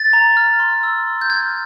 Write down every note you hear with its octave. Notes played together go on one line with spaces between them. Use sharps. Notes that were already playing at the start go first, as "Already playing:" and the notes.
Already playing: A6
A#5
F6
C6
E6
C6
G6
F6 G#6